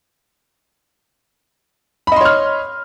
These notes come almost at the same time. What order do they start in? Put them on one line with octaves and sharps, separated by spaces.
B5 D#5 C6 C#5 F6